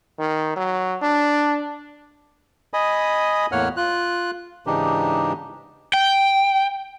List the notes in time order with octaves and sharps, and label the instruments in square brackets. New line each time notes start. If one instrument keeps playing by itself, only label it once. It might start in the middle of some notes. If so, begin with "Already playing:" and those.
[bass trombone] D#3
F#3
D4
[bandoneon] D#5 G#5 B5 D#6
E2 A2 A#3 C#5 F#5 F6
F4 F#6
G#2 C#3 E3 D4 D#4 G4
[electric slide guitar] G5